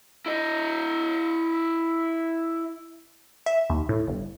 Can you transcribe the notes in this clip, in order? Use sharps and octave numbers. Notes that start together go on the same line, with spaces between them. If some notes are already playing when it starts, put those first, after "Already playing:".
E4 D#5
E5
D#2
A2
G1